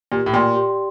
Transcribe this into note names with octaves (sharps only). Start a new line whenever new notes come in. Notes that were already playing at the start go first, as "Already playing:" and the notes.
A#2 G4
A2
A#2 D5 G5 C6
G4